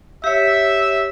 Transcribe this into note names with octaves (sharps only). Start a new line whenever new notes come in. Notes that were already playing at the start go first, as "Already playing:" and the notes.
G4 C#5 E5